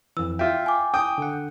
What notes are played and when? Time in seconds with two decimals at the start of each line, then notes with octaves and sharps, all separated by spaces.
0.17 F2 E3 E6
0.39 F4 E5 G5
0.66 G#5 D6
0.94 G5 D#6
1.18 D3 F#5